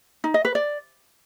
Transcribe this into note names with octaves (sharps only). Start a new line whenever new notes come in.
D#4
D#5
B4
D5